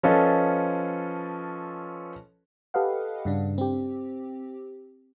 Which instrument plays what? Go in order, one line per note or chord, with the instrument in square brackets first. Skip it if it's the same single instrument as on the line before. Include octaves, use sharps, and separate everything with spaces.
[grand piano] F3 C#4 F4 A4 B4 D#5
[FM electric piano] G4 A4 B4 D#5 F5 F#5
G2 C#3 D4
C4 G4